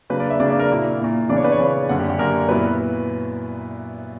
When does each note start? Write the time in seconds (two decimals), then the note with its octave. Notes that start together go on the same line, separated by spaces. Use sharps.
0.10 C#3 F#3 A#3 D4 B4
0.20 D5
0.30 E5
0.40 C#3 F#3 A#3 D4 D5
0.50 D5
0.59 A#4
0.70 A#2 A#3 E4
0.99 A#2 A#3 E4
1.29 C#3 E3 B3 D4 D5
1.37 C#5
1.44 B4
1.52 C#5
1.59 C#3 E3 B3 D4
1.89 F#2 D3 A#3 F#5
1.99 G4
2.09 G4
2.19 F#2 D3 A#3 A#4
2.49 A#2 F#3 B3 E4 B4